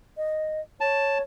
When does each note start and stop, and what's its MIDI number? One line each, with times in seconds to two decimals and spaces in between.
0.17 0.61 75
0.81 1.22 73
0.81 1.18 81